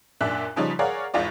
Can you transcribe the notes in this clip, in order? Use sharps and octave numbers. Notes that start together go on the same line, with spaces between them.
F#2 A#2 D4 E5 F#6
C#3 F3 G3 D#4 C#5
G#4 A#4 C#5 D5 F5 F#5
G#1 E2 F4 D5